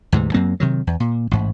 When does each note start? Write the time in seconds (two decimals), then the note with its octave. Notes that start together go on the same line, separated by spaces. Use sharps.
0.12 D2 G#2 C3 E3
0.34 F#2 F#3 A#3 C4
0.60 C3 D#3 F#3
0.87 E2
1.00 A#2
1.31 A1 G#2